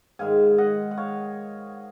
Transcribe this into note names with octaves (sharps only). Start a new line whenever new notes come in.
G#2 D#3 G#3 F5 G#5
D#5 F#5
F#5
C#5 F5